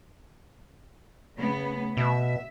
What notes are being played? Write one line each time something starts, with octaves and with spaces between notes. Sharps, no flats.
C#3 A3 B3
B2 E5